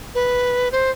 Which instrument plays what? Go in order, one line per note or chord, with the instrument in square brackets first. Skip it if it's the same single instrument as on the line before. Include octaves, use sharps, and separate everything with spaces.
[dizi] B4
C5